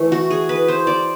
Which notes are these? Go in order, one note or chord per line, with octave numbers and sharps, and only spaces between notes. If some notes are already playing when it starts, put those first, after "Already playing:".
Already playing: E3 A3
F#4
G#4
B4
C5
D5